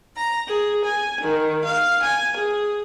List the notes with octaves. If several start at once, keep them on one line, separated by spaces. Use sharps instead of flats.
A#5
G#4
G#5
D#3
F5
G#5
G#4